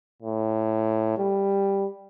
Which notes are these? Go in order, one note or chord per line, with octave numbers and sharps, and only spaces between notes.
A2
G3